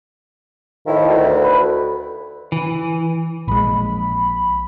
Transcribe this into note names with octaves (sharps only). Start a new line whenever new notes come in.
A2 D#3 F3 E4
D2
B4
E3
A#1 G#3 B5